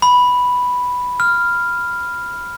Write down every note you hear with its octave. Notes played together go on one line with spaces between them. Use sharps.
B5
F6